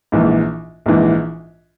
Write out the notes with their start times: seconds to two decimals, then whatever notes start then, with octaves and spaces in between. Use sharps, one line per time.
0.12 A#1 G#2 E3
0.86 A#1 G#2 E3